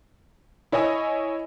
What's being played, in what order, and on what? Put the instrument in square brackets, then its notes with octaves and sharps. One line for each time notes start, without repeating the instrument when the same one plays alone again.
[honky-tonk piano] E4 C#5 D#5 G#5 E6